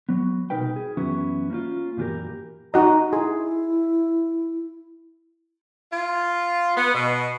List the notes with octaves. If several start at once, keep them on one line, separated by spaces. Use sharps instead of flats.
F#3 B3
C2 B2 D#4 A#4 B4 G5
G#4
F#2 E3 F#3 B3 C#4 E4
A#3 C#4 D#4 F4
F#2 A#2 E3 F4 G4 A#4
D#4 F#4 D#5 A#5
E4 G#4
F4
B3
B2